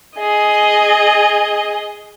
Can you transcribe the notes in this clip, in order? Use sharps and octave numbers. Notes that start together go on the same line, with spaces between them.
G#4 D#5